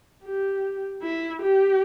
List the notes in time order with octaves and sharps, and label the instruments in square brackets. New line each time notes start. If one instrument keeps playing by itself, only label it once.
[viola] G4
E4
G4